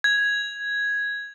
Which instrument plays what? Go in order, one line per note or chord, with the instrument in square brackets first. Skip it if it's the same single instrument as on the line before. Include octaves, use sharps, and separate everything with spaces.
[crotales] G#6